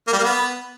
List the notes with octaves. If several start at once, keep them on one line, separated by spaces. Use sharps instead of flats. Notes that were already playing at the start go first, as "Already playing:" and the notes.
A#3
G3
A#3
B3